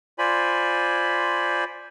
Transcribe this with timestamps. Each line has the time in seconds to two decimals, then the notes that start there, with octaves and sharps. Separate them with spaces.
0.19 F4 C5 D5 G#5 B5